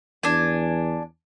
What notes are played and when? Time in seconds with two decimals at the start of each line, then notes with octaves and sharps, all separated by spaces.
0.23 E2 D4 G#5